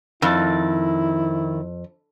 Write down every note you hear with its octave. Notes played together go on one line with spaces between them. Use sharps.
F2 D#3 E4 A5